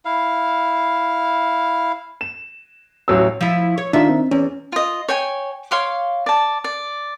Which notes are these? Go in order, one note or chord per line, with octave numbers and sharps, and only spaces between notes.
E4 F5
E7
A1 F#3 E6
F3 E4
C#5
D#3 D4 F4 E5
C4
E2 C#4
F4 D#5
C#5 G5 G#5
C#5 F5 C6 D6
D5 A5
D5